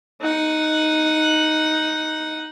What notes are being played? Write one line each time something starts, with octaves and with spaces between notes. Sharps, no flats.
D#4 F#5